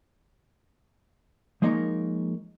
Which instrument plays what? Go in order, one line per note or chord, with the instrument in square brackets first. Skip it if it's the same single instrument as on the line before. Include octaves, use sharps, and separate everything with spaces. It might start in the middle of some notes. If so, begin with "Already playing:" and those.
[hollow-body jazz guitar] F3 G#3 A#3 D#4 A#4 C#5